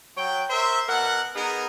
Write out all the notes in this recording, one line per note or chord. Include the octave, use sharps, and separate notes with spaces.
F#3 C#5 G5
A#4 C5 E5
B2 A#4 F#5
B3 D#4 G#4 A#4